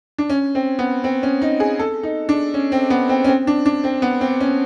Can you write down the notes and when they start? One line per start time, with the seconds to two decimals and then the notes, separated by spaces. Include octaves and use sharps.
0.18 D4
0.30 C#4
0.55 C4
0.79 B3
1.04 C4
1.23 C#4
1.42 D#4
1.60 G#4
1.79 A4
2.03 D#4
2.29 D4
2.54 C#4
2.72 C4
2.90 B3
3.09 C4
3.24 C#4
3.28 C4
3.47 D4
3.66 D4
3.84 C4
4.02 B3
4.21 C4
4.41 C#4